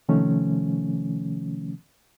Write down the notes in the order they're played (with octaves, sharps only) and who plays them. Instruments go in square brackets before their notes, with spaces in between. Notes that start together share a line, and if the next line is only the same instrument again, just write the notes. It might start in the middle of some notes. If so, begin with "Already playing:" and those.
[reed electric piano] C3 D#3 F3 A3 C#4